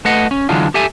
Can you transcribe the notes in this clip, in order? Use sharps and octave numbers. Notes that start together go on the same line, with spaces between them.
A3 B4 D#5 F#5
C#4
D3 E3 F#3 G#3 D4 F4
G4 A4 E5 G#5